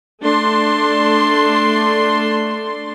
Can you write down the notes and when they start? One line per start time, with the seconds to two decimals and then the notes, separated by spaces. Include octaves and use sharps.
0.22 A3 D4 C6